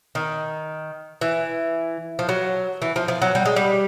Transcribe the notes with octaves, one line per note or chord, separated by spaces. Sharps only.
D#3
E3
F3
F#3
E3
F3
F3
F#3
G3
G#3
G3